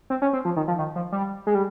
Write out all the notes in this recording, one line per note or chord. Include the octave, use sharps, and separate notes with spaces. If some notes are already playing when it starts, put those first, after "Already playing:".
C4
C#4
C4
F3
D#3
F3
D#3
F3
G3
G#3
G3